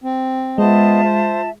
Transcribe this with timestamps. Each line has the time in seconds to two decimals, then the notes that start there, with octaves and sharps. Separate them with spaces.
0.04 C4
0.58 G#3 B3 F4 C5 D#5 E5 A5
1.04 C5